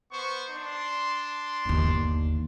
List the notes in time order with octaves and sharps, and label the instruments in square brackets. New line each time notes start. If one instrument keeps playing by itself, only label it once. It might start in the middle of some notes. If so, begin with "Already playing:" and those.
[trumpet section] B3 C5 C#6
D4 C6
[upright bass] G1 D#2